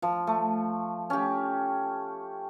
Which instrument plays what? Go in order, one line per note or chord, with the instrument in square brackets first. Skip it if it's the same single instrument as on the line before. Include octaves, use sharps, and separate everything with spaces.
[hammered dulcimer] F3
A3
C#4 G4